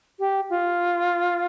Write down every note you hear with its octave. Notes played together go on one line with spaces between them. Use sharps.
G4
F4